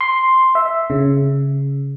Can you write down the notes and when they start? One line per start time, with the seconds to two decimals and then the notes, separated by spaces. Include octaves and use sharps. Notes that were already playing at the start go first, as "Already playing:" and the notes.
0.01 C6
0.55 E5
0.90 C#3